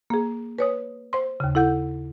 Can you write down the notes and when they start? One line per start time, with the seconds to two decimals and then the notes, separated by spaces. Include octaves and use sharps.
0.10 A#3 G#4
0.59 B4 C#5 D#6
1.13 C5 C6
1.40 D#2 C#3
1.55 E4 A4 F#5 G6